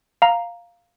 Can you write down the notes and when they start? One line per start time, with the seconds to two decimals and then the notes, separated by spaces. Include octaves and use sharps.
0.22 F5 A#5